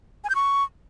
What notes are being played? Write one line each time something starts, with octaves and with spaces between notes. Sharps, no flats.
G#5
G6
C#6